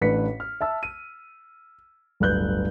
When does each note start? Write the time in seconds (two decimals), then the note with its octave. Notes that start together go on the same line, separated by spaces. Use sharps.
0.01 A1 A2 D4 B4 B6 C#7
0.40 F6
0.61 E5 A5 E6
0.83 D#7
2.20 D1 G1 B4 F#6 G6